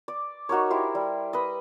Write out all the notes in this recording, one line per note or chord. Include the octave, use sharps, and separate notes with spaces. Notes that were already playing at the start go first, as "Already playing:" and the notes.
D5
D#4 F#4 A#4 C#5
E4 G4 C5
G3
B4 D#5